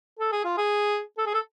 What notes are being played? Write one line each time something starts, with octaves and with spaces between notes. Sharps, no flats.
A4
G#4
F4
G#4
A4
G#4
A4